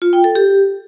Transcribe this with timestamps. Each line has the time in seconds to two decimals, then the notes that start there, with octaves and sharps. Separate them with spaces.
0.02 F4
0.13 G5
0.24 A4
0.35 G4